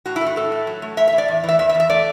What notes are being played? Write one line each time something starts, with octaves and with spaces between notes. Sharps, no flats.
A2 F#4
E4
A3
F#4
A2 A4
A3
F#3
A3
A2 E5
A2 E5
D5
E2
E3
E5
E2 E5
E5
E2
E5
A3 D5